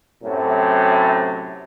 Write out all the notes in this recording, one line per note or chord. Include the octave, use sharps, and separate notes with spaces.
F#2 A2 C3 F#3